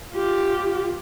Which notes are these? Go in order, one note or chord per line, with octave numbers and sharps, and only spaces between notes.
F4 G4